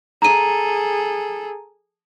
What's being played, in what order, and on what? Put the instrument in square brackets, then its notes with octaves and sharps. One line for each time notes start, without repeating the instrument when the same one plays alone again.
[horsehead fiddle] G#4 A4 [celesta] A#5 D#7